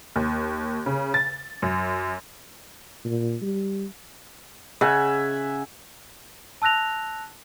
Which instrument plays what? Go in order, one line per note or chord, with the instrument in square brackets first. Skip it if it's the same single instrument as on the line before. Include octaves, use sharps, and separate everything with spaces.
[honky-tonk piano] D#2
C#3
A6
F#2
[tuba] A#2
G3
[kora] C#3 [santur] E5 F#5 G#5
[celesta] A5 E6 F#6 A#6 F7